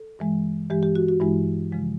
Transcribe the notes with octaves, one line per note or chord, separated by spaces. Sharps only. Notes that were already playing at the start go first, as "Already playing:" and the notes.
Already playing: A4
G2 E3 G#3
G2 E3 G#3 G4
G4
F#4
F#4
G2 E3 G#3 E4
C#3 F3 G#3